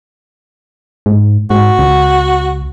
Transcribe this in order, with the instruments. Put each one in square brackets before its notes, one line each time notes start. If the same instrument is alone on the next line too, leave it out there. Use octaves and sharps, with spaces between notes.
[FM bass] G#2
[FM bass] G#2 [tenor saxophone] F#4
[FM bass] C#2